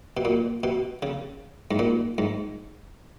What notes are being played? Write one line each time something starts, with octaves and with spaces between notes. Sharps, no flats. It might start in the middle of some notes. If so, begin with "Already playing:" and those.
B2
A#2
B2
C#3
G#2
A#2
G#2